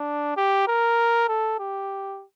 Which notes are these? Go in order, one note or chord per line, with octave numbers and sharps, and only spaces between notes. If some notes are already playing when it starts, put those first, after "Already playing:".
Already playing: D4
G4
A#4
A4
G4